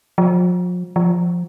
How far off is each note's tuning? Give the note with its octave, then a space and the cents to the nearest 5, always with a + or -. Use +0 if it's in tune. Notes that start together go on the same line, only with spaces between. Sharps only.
F3 +40
F3 +5